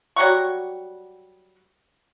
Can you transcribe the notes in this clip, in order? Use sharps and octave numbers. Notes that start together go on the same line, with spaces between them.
F#3 G3 F#5 C#6